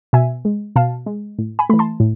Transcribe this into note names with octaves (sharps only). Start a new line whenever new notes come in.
B2 E5 G#5
G#3
B2 F5 A5
G#3
A2
G#5 B5
E3 A3 B5
A5 C6
A2